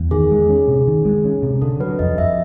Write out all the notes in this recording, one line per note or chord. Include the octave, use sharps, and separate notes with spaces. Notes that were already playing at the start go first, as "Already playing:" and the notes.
Already playing: E2
D#3 G#4
G#3
C#4
C3
D#3
G#3
C#4
C3
D3 A4
F#3 B4
F2 D#5
F2 E5